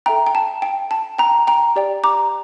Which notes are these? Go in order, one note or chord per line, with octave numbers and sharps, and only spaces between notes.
A4 E5 G5 A#5
G5
A5
G5
A5
G5 A#5
G5 A#5
G4 D5 G5
A#5 D6